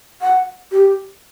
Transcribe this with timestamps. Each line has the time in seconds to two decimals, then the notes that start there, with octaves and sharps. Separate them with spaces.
0.22 F#5
0.72 G4